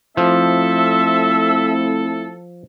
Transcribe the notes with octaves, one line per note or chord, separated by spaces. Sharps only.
F3 A3 C4 E4 A4 E5